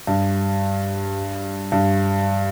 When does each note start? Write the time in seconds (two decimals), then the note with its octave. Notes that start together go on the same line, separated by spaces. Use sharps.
0.07 G2
1.72 G2